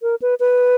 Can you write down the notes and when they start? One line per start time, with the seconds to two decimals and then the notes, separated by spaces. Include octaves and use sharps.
0.02 A#4
0.22 B4
0.40 B4